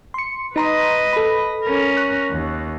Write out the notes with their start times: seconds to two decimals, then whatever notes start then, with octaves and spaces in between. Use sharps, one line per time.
0.14 C6 C#7
0.56 D#4 B4 D#5 A#5 C6
1.13 A4 B5
1.64 C#4 A#4
1.97 C#6 F#6 A#6
2.31 D#2